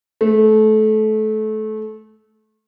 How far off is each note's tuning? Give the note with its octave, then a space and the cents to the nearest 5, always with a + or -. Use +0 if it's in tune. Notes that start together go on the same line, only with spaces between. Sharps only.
A3 -25